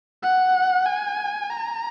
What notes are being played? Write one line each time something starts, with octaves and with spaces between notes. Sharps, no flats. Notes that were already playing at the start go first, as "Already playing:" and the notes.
F#5
G#5
A#5